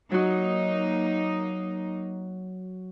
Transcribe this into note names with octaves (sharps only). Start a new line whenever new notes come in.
F#3 A#3 D#4 F#4